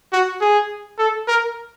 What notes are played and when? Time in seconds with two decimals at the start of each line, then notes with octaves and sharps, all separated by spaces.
0.13 F#4
0.41 G#4
0.99 A4
1.28 A#4